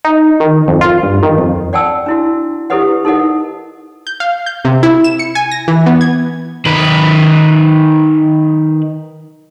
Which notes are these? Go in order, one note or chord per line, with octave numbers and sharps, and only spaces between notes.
D#4
D#3
F2
F4
G2
D#3
F2
D5 F#5 G5 A5 E6
D4 E4 F#4
E4 G4 A4 B4 D#5 F#5
D#4 A4 A#4 D#5 F#5
G6
F5
G6
C3
E4
E7
C#7
G#5
A#6
E3
B3
G#6
D#3 B4